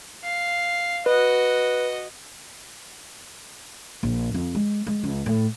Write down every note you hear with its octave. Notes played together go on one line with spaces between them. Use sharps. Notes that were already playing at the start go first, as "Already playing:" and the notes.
F5
F#4 B4 D#5
A#1
F2
G#3
G#3
C#2
A2